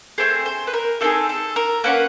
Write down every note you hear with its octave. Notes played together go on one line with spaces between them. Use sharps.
A3 C4 G#4 C5
C5
B4
A#4
A3 C4 D#4 G#4 A4
A4
A#4
A#3 C#4 F#4 B4